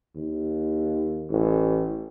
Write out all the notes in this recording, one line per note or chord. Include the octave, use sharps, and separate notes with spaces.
D#2
A1